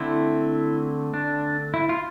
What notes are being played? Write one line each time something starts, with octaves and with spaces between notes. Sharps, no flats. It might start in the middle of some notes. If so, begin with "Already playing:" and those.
Already playing: D3 A3 C4 E4
D4
E4
F4